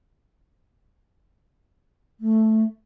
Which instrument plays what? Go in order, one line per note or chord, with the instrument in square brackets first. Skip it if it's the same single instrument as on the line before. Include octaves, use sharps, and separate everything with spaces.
[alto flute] A3